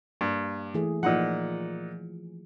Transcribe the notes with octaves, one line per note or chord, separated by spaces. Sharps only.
G2 A#3
E3 A3 G#4
A#2 F3 D#4 F#5